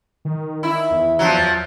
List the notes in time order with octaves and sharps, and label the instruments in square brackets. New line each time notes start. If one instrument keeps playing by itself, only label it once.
[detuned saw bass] D#3
[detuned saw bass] D#3 [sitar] E4
[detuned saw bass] E2
[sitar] F3 F#3